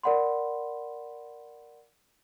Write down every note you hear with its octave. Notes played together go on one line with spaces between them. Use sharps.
A#4 D5 F#5 B5 C6